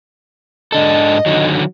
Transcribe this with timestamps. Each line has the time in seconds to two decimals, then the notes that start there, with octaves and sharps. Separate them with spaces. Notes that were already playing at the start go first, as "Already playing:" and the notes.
0.72 G#2 D4 A4 D#5
1.26 D3 D#3 F#3